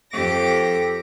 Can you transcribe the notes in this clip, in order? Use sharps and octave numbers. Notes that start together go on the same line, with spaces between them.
F2 G4 A4 D6 A#6